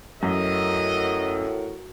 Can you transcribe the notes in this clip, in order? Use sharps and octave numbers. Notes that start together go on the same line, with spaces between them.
F#2 A2 F#4 A#4 D#5